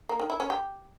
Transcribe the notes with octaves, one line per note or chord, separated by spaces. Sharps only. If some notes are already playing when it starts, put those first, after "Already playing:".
A#3
D#3
E4
C#4
G4